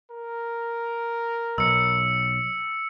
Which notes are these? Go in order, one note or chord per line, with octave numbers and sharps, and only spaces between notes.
A#4
B1 E6 C#7